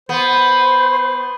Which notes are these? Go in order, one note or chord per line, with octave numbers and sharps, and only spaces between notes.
B3 C5